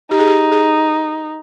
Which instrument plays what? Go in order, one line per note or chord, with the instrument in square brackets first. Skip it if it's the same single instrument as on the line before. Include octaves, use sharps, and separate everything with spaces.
[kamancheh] D#4 [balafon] G4
[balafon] G#4
G4
G#4